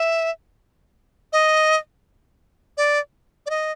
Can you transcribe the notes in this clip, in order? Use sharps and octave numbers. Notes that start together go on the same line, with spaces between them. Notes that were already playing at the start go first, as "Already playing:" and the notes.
Already playing: E5
D#5
D5
D5
D#5